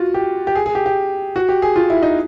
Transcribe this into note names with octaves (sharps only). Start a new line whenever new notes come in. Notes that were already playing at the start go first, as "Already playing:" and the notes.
Already playing: F4 F#4
G4
G4
G#4
G#4
G4
G4
F#4
G4
G#4
F4
E4
D#4